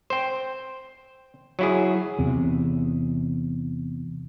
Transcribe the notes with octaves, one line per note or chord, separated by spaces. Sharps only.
C5 G5
F#3 E4 G#4
E2 C3